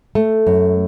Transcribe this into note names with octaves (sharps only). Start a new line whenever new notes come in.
A3
F#2